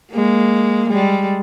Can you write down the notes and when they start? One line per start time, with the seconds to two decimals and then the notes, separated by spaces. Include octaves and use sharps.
0.12 G#3 A#3
0.89 G3 G#3